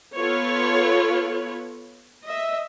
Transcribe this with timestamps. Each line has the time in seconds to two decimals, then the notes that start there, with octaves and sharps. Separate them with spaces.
0.16 B3 F4 A4 B4 C#5
2.24 D#5 E5